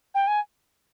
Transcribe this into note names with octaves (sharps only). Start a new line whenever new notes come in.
G5
G#5